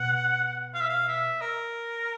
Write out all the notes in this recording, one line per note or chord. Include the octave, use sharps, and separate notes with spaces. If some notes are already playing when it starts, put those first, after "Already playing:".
Already playing: B2 F#5
F5
E5
F5
E5
A#4